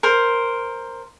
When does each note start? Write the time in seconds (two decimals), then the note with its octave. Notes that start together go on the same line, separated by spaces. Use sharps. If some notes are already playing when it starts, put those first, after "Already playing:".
0.03 A#4 C5